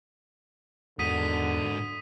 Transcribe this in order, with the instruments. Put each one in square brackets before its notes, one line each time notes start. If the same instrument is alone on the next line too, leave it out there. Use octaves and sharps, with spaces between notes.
[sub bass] E2 [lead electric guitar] G#2 F#4 [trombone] D3 [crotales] D#6 B6 D#7